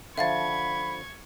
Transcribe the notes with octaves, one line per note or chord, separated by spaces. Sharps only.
D3 F3 E5 F5 B5 C#6 G#6 A6